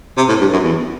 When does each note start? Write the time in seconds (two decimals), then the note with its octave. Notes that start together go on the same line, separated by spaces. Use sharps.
0.17 C3
0.29 A2
0.40 G2
0.53 F#2
0.64 E2